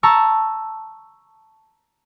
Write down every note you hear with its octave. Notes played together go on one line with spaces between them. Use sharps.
A5 A#5 C#6 E6